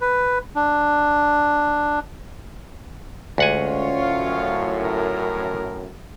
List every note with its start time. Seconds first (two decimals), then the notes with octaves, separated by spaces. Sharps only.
0.01 B4
0.56 D4
3.38 D2 G#3 C#4 F4 C#5 F#5 G#5
4.02 F#2 A2 F5
4.83 A#4